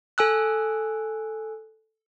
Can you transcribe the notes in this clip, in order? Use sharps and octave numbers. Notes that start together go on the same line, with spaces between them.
A4 G#5 E6 F#6